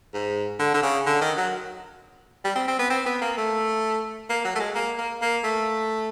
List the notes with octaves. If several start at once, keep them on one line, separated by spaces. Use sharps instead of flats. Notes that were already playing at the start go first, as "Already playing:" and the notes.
G#2
D3
D3
C#3
D3
D#3
F#3
G3
C4
C4
B3
C4
B3
A#3
A3
A#3
F#3
A3
G#3
A#3
A#3
A#3
A3